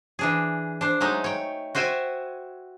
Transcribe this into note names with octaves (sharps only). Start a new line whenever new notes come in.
E3 D4 G#4
D4 C5
F#3 G#3 A3 D#4
C#5 G5
F#4 C5 E5 G5 G#5